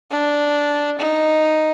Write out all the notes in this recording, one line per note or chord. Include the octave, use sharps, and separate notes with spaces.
D4
D#4